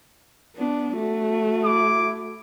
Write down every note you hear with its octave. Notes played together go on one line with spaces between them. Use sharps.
B3 D4
A3 F#4
E4 D6